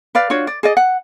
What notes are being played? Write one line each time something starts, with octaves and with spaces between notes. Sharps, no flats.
B4 D5 F5
D4 F4 F#4 C#5
D5
G#4 D5 D#5
F#5